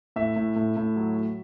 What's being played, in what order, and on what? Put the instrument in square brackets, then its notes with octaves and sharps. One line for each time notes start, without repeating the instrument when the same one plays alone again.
[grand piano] A2 E5
A2
A2
A2
F#3
F#3